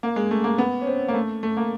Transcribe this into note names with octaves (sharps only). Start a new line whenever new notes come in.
A#3
G#3
A3
A#3
B3
C#4
C4
A#3
A3
A3
A#3